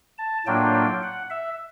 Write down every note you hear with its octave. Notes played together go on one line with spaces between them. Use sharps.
A5
A2 F#3 A#3 D4 F4 G5
G5
F#5
E5